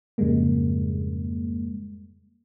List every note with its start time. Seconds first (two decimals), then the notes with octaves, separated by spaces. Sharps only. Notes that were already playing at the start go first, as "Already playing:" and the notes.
0.18 F2 G#2 C#3 G3 G#3 A#3